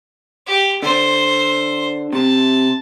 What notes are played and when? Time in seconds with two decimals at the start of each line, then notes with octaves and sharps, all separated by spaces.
0.46 G4
0.83 D3 C5
2.13 C3 A5